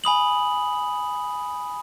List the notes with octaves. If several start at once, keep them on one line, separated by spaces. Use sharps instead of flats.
G#5 B5 D#6 F#7